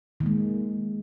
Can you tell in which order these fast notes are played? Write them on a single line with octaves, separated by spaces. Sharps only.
D#3 A#3 G#3